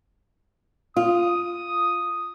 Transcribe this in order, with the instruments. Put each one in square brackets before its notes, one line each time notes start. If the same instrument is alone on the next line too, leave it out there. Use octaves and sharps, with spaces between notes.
[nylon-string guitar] F4 [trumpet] D#6